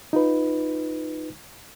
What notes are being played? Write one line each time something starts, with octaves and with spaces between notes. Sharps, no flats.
D#4 F4 B4